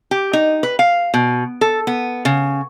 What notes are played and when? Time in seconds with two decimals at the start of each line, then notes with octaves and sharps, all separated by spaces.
0.11 G4
0.33 D#4
0.63 B4
0.79 F5
1.14 B2
1.61 A4
1.87 B3
2.25 C#3